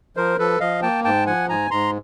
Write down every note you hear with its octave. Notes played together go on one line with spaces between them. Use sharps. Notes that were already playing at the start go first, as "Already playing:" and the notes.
F3 A#4 C5
F3 A4 B4
F3 D#5 F5
A#3 G5 A5
G#2 G5 A5
F3 F#5 G#5
G#2 G#5 A#5
G#2 A#5 C6